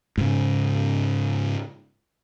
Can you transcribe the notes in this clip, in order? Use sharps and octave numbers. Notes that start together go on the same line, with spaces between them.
G#2 C#3